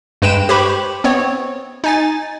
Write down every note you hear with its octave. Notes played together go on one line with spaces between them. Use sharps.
G2 G#3 B4 G5 D7 E7
G4 B4 C5 B5 C#6
B3 C4 C#5
D#4 G#5 A6